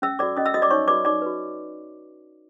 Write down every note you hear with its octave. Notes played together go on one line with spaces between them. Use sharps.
C#4 E5 E6
F#4 A4 D5 D6
C#4 D#5 D#6
E5 E6
F#4 A4 D#5 D#6
D5 D6
D#4 C#5 C#6
F#4 B4 D5 D6
D#4 D5 D6
F#4 B4